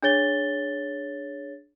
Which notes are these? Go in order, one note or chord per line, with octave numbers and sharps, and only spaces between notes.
D4 G#4 C#5 A6 G7